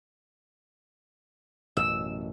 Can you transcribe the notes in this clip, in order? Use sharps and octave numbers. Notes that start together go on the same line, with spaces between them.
A1 F#2 B2 E6